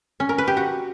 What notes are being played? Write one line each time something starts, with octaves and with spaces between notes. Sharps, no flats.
C#4
A#4
B4
G4
F#4